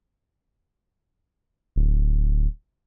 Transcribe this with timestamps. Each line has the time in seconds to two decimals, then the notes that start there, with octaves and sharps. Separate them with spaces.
1.76 D1